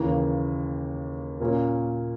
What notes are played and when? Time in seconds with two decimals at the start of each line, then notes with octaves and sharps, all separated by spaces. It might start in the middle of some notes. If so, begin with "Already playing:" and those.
Already playing: D#2 C#3 E3 A#3
1.40 A#2 A#3 C#4